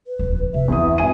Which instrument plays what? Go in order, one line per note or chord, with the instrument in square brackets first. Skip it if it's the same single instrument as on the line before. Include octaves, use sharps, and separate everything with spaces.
[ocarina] B4
[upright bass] D#1 F2
[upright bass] C3 [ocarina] E5
[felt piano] E2 E4 D#6 [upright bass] C4 D4
[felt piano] G#1 G#5 D#7